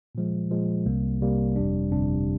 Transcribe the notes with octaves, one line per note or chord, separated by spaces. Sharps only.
A#2 F3 G#3
A#2 F3 G#3
C2 C3 G3 A#3
C2 C3 G3 A#3
G1 F2 C3 G3 D4
G1 F2 C3 G3 D4